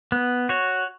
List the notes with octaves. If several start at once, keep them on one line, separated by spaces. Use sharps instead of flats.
B3
F#4 C#5